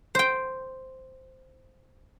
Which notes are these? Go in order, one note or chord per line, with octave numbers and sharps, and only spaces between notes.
C5 G5